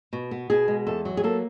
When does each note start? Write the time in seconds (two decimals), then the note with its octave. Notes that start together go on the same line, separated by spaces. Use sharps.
0.13 B2
0.31 B3
0.50 B2 G#4
0.68 G#3
0.87 E2 A4
1.05 F#3
1.17 G#4
1.23 A#3 A4